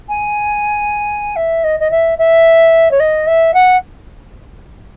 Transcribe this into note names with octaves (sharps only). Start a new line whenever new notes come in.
G#5
E5
D#5
D#5
E5
E5
C#5
D#5
E5
F#5